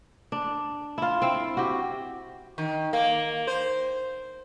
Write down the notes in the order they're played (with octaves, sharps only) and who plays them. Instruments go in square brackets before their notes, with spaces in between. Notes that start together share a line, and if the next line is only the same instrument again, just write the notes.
[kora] D4
E4 F4
C4 E4
F#4 G4
[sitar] D#3
A#3
C5